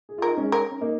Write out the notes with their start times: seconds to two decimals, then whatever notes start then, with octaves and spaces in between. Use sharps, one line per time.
0.09 G#4
0.18 F4 A#4
0.28 D#4
0.37 G#3 C#4
0.52 A#4
0.71 C#4
0.81 A#3 D#4